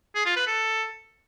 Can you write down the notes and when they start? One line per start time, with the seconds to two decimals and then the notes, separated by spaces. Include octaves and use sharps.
0.15 G#4
0.26 F4
0.36 B4
0.47 A4